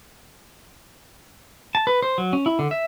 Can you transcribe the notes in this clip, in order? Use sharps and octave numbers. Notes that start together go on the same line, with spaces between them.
A5
B4
C5
F#3
C#4
E4
D3
E5